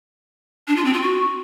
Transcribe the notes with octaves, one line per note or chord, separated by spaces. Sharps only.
D4
F4
C4
F4
F#4